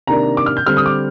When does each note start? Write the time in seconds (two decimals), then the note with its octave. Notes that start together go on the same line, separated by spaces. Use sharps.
0.07 C3 D#3 A#3 D4 A#5
0.37 D6
0.46 F6
0.57 G6
0.66 D3 G3 C4 F6
0.77 D#6
0.86 D6